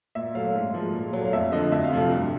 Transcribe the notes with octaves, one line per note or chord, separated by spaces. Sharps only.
A#2 E5
F#3 A3 F5
G#2
F3 G#3
A#2
F#3 A3
F5
F2 E5
D3 F3 D#5
F2 E5
F5
C3 F3 A3
G2